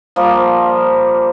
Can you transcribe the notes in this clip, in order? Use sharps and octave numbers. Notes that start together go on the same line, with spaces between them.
F3 G3 A#3